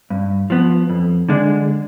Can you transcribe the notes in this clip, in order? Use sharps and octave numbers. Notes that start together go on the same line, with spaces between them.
G2
F3 B3
F2
D3 G#3 D4